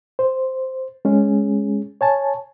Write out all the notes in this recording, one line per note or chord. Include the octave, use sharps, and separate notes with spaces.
C5
G#3 C#4 G#4
C#5 G#5 A5